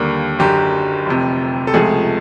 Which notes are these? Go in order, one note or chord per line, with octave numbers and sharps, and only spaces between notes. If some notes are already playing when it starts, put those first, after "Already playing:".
Already playing: D#2 D3 G3 A#3
F#1 F#2 D3 G4
F1 F2 C3
A4
C#2 C3 F3 A3 G#4